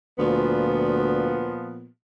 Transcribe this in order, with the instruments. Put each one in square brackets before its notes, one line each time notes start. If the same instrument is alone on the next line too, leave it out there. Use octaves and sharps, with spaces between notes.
[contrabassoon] D2 [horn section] A#2 F3 B3